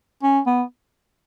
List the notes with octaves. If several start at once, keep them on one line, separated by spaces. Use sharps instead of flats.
C#4
B3